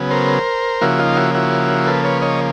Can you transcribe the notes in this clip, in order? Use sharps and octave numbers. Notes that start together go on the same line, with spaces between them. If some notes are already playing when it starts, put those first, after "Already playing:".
Already playing: C#3 F#3 B3
A#4 C5
C#3 F3 A#3 E4 F#4
D#4 F4
E4 F#4
E4 F#4
A4 B4
B4 C#5
C#5 D#5